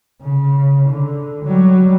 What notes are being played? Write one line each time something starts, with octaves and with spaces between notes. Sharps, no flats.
C#3
D3
F#3 G3